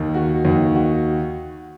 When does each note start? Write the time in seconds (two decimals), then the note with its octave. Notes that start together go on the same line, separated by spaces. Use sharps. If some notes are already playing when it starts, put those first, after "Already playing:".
Already playing: D#2 D#3
0.14 F#4
0.45 D#2
0.75 F#4